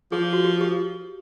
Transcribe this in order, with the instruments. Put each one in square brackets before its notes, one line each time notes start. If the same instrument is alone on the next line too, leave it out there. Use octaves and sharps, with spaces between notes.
[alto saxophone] F3 [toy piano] G#4
[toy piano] F#4
G4
G4